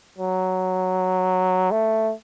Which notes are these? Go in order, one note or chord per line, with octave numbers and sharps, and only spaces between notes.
F#3
A3